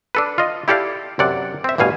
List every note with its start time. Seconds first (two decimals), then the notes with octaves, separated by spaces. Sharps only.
0.15 D4 A4 B4
0.38 F4 D#5
0.68 E4 G4 A4 D5 F5
1.19 F#2 C3 D5 F#5
1.64 C4 E5
1.78 A1 G2 B2 F5 G#5